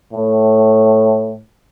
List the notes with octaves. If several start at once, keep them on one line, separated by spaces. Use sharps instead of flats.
A2